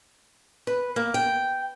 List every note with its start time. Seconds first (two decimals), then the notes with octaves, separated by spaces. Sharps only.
0.67 B4
0.96 A#3
1.14 G5